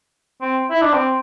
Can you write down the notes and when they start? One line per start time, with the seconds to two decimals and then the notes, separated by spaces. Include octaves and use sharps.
0.42 C4
0.70 E4
0.82 D4
0.93 C4